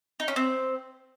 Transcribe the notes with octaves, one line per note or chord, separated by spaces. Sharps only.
D#4
C#4
C4